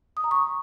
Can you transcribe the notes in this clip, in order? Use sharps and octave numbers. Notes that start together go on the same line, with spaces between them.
D#6
A#5
C#6